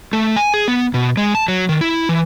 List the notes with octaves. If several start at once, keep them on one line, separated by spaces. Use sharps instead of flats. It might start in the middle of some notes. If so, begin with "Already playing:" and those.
A3
G#5
G#4
B3
B2
G#3
A5
F#3
D#3
E4
E3